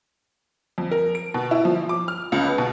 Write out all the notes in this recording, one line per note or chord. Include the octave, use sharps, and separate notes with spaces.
F2
A#4
D7
B2
E4
F3
D6
F6
C#2
B3
B2